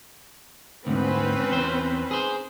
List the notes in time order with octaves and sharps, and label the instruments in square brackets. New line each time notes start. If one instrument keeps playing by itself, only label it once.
[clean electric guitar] D2 G#2 [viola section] C4 C#4 B4
[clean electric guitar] E2 C5
G#4 C5